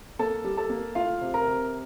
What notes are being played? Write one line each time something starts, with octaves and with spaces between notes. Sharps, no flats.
A#3 A4 A5
G3
A4 A5
A#3
A3 F4 F5
C3
A#4 A#5
C3